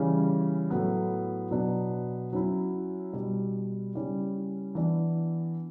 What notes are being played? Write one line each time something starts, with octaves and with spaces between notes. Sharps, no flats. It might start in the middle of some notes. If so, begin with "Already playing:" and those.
Already playing: C#3 E3 G3 C#4 E4
A2 F#3 B3
B2 F#3 B3 D4
F#3 C#4 E4
B2 G3 D4
C#3 G3 C#4 E4
E3 B3 D4